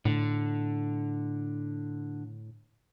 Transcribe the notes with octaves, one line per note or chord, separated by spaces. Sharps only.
A2 D3